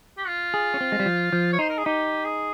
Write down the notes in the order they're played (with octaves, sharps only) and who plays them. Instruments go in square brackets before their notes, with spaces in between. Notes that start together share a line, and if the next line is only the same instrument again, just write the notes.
[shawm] G4
F4
[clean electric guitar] G#4
C#4
C4
G#3
G3
F3
F3
[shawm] C#5
[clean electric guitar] D#4 [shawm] C5
[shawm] A#4
G#4
[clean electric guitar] D#4 [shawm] G4
[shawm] G#4